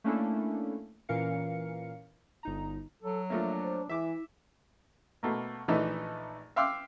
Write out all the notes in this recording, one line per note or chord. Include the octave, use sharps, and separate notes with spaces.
A3 A#3 C#4 D4 E4 A4
A#2 E3 C#4 A#4 F5 C#7
G1 D#4 A#5
F#3 A4
F3 A3 A#3 D4 E5
C5
E3 E4 E5 D6
B2 A3 A#3
A#1 E3 A3 D#4 E5
E5 F5 G5 C6 D6 E6